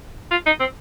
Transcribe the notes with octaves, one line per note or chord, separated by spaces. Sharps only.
F4
D#4
C4